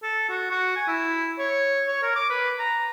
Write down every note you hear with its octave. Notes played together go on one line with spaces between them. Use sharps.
A4
F#4
F#4
G#5
E4
C#5
C#5
A#4
D6
B4
A#5